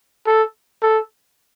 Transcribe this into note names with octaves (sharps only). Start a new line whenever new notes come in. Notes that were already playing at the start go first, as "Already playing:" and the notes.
A4
A4